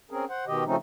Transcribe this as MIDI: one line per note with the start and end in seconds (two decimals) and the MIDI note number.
0.11 0.25 60
0.11 0.25 61
0.11 0.25 68
0.11 0.25 70
0.29 0.45 72
0.29 0.45 78
0.47 0.64 47
0.47 0.64 51
0.47 0.64 67
0.47 0.64 75
0.66 0.76 49
0.66 0.76 53
0.66 0.76 57
0.66 0.76 60
0.66 0.76 61
0.66 0.76 63